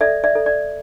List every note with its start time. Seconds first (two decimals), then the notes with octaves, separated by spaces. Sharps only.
0.01 A4 D5 E5
0.24 D5 E5
0.35 A4
0.46 D5